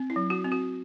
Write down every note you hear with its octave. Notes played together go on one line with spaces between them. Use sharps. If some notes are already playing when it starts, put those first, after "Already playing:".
Already playing: C4
E4
F#3
F#4
C4
F#4